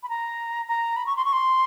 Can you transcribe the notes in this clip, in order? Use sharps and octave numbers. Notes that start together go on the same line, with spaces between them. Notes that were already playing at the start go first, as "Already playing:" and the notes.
B5
A#5
A#5
B5
C#6
C6
C#6
C6